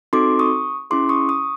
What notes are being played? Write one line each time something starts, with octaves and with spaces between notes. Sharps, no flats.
C4 D#4 F#4 A4 C6 D6
C#6 D#6
C#4 E4 G#4 C6 D6
C#6 D#6
C#6 D#6